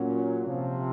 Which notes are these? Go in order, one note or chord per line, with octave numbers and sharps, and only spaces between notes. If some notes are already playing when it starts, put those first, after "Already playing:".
Already playing: A#2 F#3 C#4
C3 F3